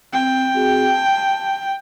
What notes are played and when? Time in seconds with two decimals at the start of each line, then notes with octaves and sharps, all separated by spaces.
0.13 C4 G5
0.54 C4 F#4 G#4
0.90 A5